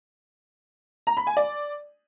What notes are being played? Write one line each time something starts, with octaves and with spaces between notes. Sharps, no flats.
A#5
B5
G#5
D5